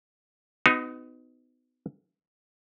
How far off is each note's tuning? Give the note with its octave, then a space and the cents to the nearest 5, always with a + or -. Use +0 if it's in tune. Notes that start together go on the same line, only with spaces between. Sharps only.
B3 +35 D#4 +0 F#4 +0